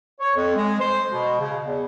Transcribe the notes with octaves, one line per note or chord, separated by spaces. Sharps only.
C#5
F2
G#3
C5
B2
C#3
E2